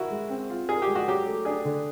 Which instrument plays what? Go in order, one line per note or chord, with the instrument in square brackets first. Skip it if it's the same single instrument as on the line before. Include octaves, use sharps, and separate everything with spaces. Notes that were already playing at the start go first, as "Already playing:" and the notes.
Already playing: [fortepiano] E4 F#4 [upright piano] A#4
[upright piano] G#3
C4
F4
[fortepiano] G#4 [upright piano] A#4
[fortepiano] G4
[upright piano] G#3
[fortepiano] F#4
[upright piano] F#3 [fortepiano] G4
[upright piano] A3
[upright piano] D4 [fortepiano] G#4
[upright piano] D3